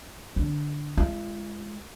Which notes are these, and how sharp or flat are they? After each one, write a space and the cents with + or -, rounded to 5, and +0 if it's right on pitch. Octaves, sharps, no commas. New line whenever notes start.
D3 +0 D4 +0
G#3 +0 F4 -40